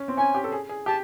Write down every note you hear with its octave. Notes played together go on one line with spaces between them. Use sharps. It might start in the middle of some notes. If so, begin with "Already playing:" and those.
Already playing: C#4
C4
C#4 G#5
G4
A4
G#4
G#4
G4 A5